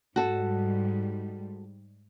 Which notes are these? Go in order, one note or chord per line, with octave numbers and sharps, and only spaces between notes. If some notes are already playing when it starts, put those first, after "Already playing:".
G#2 G3 F#4 A4